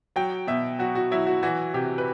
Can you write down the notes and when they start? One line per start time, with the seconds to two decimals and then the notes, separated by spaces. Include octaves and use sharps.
0.16 F#3 G5
0.47 B2 E5
0.79 F#3 F#4
0.95 F#4
1.11 F#3 E4
1.27 F#4
1.43 E3 F#4
1.74 C3 G4
1.98 B4